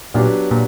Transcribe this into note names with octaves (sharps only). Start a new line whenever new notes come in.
A#2 F#3 B3 D4 G4
A#2